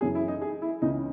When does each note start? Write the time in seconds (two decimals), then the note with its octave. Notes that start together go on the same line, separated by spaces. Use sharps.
0.01 F#2 C#3 E3 G#4
0.15 E4
0.28 D#4
0.42 G#4
0.62 E4
0.82 C#2 C#3 E3 D#4